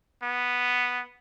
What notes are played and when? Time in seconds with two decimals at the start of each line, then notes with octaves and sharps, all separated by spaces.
0.23 B3